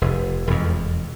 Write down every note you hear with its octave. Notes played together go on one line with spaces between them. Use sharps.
F1
E1 F2